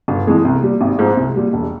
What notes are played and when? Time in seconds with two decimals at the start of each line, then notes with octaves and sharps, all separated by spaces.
0.08 G1
0.27 F2 E3 G#3
0.45 C2
0.62 A#2 G3
0.81 G#1
0.99 G#2 F3 C4
1.17 C2
1.36 A#2 G3
1.53 E1